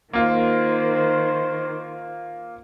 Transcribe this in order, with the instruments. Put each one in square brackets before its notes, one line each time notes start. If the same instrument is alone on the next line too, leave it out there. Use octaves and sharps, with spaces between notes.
[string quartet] D#3 C5 [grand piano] A#3 F4